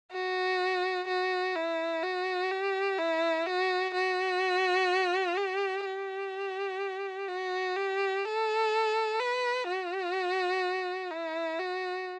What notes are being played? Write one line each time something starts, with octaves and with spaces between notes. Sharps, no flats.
F#4
F#4
E4
F#4
G4
E4
F#4
F#4
G4
G4
F#4
G4
A4
B4
F#4
E4
F#4